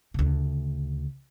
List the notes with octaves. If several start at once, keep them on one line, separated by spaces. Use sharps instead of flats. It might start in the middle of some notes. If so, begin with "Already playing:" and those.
D2 C#3